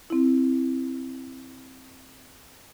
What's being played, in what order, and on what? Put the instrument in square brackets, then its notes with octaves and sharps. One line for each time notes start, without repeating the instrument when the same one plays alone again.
[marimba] C4 E4